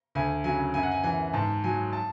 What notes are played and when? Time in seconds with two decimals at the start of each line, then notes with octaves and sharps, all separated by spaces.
0.15 D2 G#5
0.44 C#3 F#3 G#5
0.74 F#2 G#5
0.83 F#5
0.92 G#5
1.04 E3 G#5
1.33 G#2 A5
1.64 F#3 G#5
1.93 A5